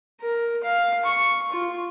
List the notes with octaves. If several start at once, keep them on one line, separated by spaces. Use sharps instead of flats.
A#4
F5
C#6
F4